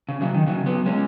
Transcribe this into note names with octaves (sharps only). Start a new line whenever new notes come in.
C#3
C#3 F#3
D#3
C#3 F#3
F#3 B3
G#3 C#4